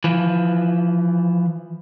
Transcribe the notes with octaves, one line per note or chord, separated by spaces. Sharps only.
E3 F3